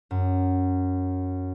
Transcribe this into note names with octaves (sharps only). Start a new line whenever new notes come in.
F#2